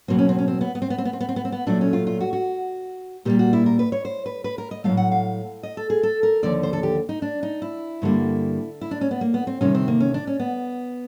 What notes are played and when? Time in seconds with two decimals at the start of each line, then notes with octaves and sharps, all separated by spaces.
0.08 E2 B2 F#3 A#3 C4
0.18 C#4
0.29 C4
0.38 C#4
0.48 C4
0.61 B3
0.75 B3
0.82 C4
0.90 B3
0.98 C4
1.05 B3
1.13 C4
1.20 B3
1.29 C4
1.36 B3
1.45 C4
1.52 B3
1.67 A#2 F#3 A3 D4
1.81 C#4
1.93 F4
2.07 F4
2.21 F#4
2.33 F#4
3.25 A#2 G3 A#3 G4
3.39 F#4
3.53 E4
3.66 A#4
3.79 B4
3.92 C#5
4.05 C5
4.26 B4
4.44 B4
4.58 A#4
4.71 D#5
4.84 A2 F#3 A3 F5
4.97 F#5
5.12 F5
5.63 D#5
5.77 A4
5.90 G#4
6.03 A4
6.23 A#4
6.43 D#2 D3 F3 D5
6.63 C5
6.73 A4
6.83 G4
7.09 D#4
7.22 D4
7.43 D#4
7.62 E4
8.02 G2 D3 G3 A#3
8.81 E4
8.91 D4
9.01 C#4
9.11 B3
9.21 A#3
9.34 B3
9.47 C4
9.61 D2 C3 D#3 G3 C#4
9.75 C4
9.88 A#3
10.00 C#4
10.14 D4
10.27 C#4
10.39 B3